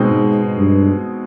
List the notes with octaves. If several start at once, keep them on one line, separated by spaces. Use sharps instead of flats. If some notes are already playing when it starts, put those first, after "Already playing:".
Already playing: B2 G#3 C4 D#4
G#2
G2